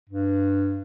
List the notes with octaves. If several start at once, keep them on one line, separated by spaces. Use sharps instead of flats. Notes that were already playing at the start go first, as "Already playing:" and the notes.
G2